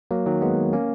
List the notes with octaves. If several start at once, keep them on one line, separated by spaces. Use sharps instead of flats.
F#3 A#3
D#3 F#3
G#3 B3
A#3 C#4